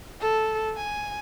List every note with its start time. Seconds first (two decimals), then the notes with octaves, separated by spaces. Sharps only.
0.21 A4
0.77 G#5